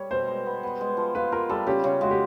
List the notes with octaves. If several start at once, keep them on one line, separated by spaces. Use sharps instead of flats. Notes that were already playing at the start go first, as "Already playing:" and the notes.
Already playing: G3 C#5
B2 C5
G#3
B3
B3
G#3
F3
F4 B4
F4 A#4
G3 A4
C#3 G4
C#3
G#3 F#4
G4